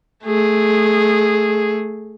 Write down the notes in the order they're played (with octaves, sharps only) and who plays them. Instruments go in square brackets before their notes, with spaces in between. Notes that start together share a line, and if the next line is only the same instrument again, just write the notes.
[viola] A3 G#4